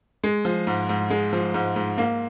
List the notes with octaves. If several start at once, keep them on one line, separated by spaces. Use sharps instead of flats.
G#3
F3
G#2
G#2
G#3
F3
G#2
G#2
A#3